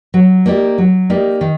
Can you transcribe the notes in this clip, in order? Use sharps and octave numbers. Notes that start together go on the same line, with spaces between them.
F#3
A#3 D#4 G4 D5
F#3
A#3 D#4 G4 D5
D#3